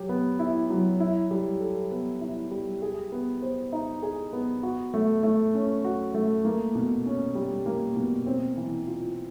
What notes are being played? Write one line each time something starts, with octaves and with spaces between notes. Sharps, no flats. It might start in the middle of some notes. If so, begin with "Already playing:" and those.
Already playing: F#3 G4
B3
E4
F#3
E4
G3
A4
B3
E4
G3
G#4
B3
C5
D#4
G#4
B3
F#4
A3
A3
C#4
F#4
A3
A#3
B2
C#4
G3
A#3
B2
C4
E3
F4